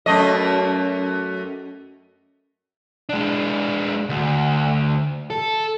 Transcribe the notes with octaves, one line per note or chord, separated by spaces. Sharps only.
F#2 A3 D#5
G#3 D4
D2
A4